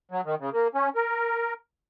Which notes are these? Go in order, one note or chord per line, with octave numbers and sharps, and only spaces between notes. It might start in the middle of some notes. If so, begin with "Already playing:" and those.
F#3
D#3
C#3
A#3
C#4
A#4